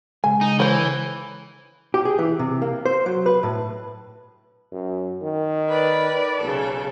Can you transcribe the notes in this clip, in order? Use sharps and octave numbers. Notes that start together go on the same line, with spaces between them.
C#3 G#3 G#5
D#4
E3 C5 C#5
G4
G#4
E3
C3
A#3
C5
F#3
B4
A2
F#2
D#3
B4 D5
B1 C#3 A4